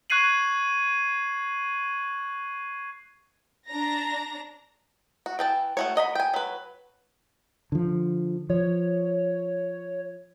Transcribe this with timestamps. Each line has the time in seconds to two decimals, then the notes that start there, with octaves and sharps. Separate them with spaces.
0.10 C#6 F#6 G#6 C7 D#7 F#7
3.69 D4 A#5 A#6
5.26 F#4
5.39 E3 G5 A5
5.77 A3 F#4 C#5
5.96 F#4 D#5 A#5 B5
6.15 G5 G#5
6.34 F#3 B4
7.72 D3 F3
8.50 F3 C#5